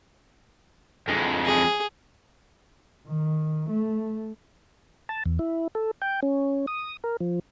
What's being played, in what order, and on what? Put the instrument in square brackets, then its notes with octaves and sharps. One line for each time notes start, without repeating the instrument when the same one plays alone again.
[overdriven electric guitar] F2 G#3
[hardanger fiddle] G#4
[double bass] D#3
A3
[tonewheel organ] A5
E2
E4
A4
G5
C#4
D#6
A#4
F3